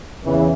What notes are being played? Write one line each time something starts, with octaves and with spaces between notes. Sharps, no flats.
E2 C#3 E3